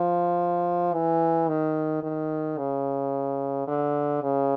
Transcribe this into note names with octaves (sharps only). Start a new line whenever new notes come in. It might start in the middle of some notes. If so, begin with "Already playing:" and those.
Already playing: F3
E3
D#3
D#3
C#3
D3
C#3